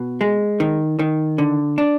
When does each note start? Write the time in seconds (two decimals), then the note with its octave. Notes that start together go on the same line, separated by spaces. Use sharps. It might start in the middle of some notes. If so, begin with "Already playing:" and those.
Already playing: B2
0.21 G#3
0.60 D#3
0.99 D#3
1.38 D3
1.78 D4